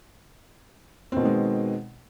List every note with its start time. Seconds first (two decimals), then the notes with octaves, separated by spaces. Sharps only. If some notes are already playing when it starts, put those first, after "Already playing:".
1.12 C4
1.16 B2
1.21 D#3
1.25 G#3